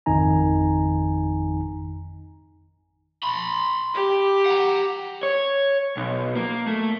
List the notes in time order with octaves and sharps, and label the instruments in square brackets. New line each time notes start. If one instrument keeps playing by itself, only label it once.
[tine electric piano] G#1 F2 D#3 D#4 G#5 A#5
[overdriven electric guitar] B5 C6
[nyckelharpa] G4
[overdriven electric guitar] F#5 A#5
C#5
B1
A#3
A3